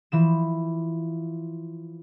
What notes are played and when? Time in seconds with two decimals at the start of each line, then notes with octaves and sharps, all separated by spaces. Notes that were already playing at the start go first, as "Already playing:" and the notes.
0.12 E3 F3 E7